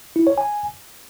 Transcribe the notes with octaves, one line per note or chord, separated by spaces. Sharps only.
E4
C#5
G#5